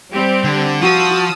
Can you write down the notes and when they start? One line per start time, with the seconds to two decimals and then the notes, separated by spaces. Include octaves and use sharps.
0.11 G3 C4 G4
0.44 D3
0.81 F3 F#4 A5 D#6 E6